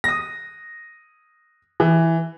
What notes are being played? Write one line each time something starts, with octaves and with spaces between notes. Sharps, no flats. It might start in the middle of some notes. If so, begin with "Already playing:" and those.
D#6 A#6
E3